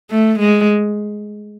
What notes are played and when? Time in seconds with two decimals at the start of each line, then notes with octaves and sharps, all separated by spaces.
0.10 A3
0.40 G#3